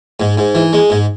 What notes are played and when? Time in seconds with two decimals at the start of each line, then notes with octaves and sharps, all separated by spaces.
0.20 G#2
0.37 G#2
0.55 E3
0.73 G#3
0.90 G#2